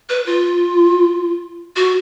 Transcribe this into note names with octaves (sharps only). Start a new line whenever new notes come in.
B4
F4
F#4